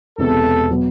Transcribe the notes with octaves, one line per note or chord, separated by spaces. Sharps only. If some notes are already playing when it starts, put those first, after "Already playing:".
E1 E2 C3 A4
B2 F#3 B3